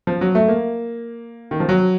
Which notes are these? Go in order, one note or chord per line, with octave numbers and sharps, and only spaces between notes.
F3
F#3
A3
A#3
D#3
F3
F#3